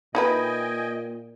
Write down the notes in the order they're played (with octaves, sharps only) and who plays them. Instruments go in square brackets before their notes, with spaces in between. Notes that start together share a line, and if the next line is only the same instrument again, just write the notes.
[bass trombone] A#2 [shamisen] D#4 E4 B4 [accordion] D#5 G5 G#5